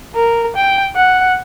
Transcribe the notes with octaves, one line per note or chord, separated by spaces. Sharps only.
A#4
G5
F#5